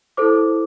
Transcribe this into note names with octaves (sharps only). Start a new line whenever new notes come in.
E4 A4 C5 D6